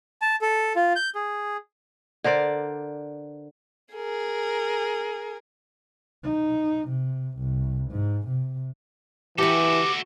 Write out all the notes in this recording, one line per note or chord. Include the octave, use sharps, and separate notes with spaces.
A5
A4
F4
G6
G#4
D3 A#4 C5 D5
G#4 A#4
D#4
C3
C2
G#2
C3
E3 F#4 G4 A4 B4 D6